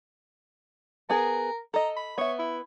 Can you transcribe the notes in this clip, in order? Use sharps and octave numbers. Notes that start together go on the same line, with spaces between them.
B3 G#4 A#4
A4 D#5 A#5
B5
B3 C#5 E5
E4